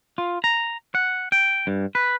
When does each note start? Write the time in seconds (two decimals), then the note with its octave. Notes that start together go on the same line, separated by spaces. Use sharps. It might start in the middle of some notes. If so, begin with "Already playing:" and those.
0.18 F4
0.44 A#5
0.95 F#5
1.32 G5
1.67 G2
1.95 B4